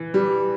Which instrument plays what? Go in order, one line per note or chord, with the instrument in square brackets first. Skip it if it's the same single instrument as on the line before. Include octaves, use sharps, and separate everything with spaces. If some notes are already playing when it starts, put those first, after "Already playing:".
Already playing: [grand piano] E3
[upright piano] G3